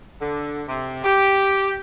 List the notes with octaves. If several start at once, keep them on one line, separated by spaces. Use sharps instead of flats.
D3
C3
G4